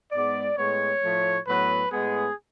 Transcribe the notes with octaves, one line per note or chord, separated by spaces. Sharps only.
G#2 G#3 B3 D5
A2 G#3 B3 C#5
A2 F3 A3
A2 F#3 B3 B4
A2 G#3 B3 G#4